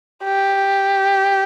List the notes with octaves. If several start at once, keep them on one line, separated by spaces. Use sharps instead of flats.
G4